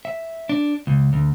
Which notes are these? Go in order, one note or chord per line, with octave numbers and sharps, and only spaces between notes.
E5
D4
C#2
D2